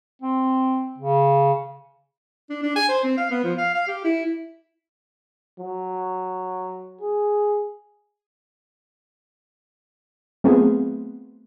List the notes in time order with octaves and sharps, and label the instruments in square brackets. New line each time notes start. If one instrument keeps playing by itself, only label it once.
[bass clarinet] C4
C#3
[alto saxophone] D4
D4
G#5
C5
C4
F5
B3
F3
F5
F5
G4
E4
[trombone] F#3
G#4
[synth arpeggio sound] F#3 A3 B3 C4 F4 G#4